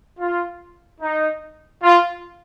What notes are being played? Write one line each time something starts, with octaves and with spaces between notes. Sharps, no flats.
F4
D#4
F4